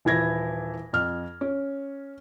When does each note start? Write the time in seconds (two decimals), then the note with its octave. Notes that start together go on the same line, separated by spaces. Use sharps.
0.05 D#1 E3 E4 G#6 A#6
0.93 F2 F6
1.41 C#4